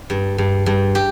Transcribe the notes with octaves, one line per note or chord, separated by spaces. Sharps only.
G2
G2
G2
G4